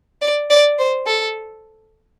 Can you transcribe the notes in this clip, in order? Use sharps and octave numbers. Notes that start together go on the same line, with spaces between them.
D5
D5
C5
A4